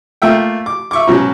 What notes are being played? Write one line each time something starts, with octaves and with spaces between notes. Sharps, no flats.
A3 A#3 F4 E5 G5
D6
E5 C#6 D6
G#2 B2 F#3 C#4